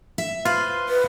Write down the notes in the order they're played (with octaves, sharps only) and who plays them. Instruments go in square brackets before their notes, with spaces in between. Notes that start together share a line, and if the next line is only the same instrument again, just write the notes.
[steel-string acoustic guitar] E5
[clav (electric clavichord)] F4 [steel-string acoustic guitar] B4 C5
[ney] B4